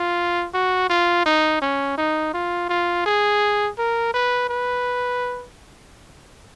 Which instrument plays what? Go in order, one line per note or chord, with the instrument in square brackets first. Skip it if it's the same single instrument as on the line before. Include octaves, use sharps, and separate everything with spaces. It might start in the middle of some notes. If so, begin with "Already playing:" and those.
Already playing: [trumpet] F4
F#4
F4
D#4
C#4
D#4
F4
F4
G#4
A#4
B4
B4